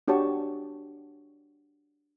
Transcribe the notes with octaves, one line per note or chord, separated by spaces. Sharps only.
D4 F#4 G4 C#5 A5 C#6